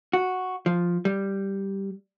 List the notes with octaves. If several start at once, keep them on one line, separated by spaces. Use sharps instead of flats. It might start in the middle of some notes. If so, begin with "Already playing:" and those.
F#4
F3
G3